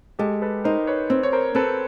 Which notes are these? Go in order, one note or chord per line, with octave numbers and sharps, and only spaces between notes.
G#3 G4 A4
A4 B4
D#4 A#4 C5
B4 C#5
C4
C#5
A#4 C5
C4 A4 B4